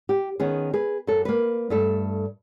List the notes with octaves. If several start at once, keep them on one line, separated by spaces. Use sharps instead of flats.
G4
D#3 B3 C#4 G#4
G#4 B4
F#2 A4
A#3 B4
G2 A3 A4